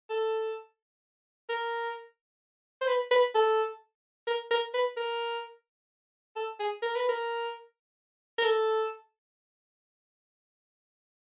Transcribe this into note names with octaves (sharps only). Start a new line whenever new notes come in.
A4
A#4
C5
B4
B4
A4
A#4
A#4
B4
A#4
A4
G#4
A#4
B4
A#4
A#4
A4